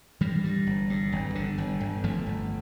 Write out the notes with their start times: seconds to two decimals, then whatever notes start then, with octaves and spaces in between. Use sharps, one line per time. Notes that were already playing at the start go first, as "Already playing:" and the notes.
0.21 G2 E3 G3
0.44 G2
0.67 G1
0.90 G2
1.12 G1
1.35 D3
1.58 G1
1.81 G1
2.04 G1 F3 A3
2.26 G1